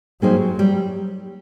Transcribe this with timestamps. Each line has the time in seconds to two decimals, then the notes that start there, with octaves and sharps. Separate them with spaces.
0.21 F#3 G3 A#3 D#4 G#4 C5
0.59 G3